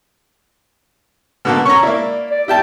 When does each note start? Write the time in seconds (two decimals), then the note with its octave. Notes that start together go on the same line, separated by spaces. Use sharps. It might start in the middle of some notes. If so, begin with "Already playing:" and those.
1.45 B2 D3 A#3
1.65 C#4 A#5 C#6
1.83 A#3 E4 D5
2.30 D5
2.48 E4 G4 G5 A5